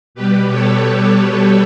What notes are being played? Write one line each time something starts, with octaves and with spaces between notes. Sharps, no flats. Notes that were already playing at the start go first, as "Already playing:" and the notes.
B2 G3 G4 B4
A4 C#5